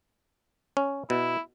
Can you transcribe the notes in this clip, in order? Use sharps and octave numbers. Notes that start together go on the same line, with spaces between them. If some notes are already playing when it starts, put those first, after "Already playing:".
C#4
B2 E4